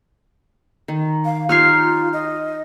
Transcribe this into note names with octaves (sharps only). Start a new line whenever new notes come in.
D#3
F5
D#4 F4 G4 C#5 F6 C7
D#5